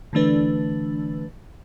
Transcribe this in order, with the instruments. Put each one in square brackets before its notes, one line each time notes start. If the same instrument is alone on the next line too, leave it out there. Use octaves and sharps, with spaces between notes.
[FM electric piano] D3 E3 A3 D4 B4